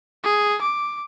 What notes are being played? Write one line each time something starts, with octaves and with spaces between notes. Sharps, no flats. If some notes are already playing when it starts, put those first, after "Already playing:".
G#4
D6